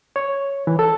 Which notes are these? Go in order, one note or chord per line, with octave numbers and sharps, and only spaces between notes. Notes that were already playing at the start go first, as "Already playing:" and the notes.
C#5
E3
A4